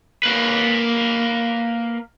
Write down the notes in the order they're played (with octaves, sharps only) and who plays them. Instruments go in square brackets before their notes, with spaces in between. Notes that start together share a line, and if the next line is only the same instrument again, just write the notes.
[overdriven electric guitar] A#3 B4